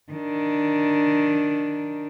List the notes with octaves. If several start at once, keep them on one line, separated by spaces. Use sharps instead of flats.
D#3 D4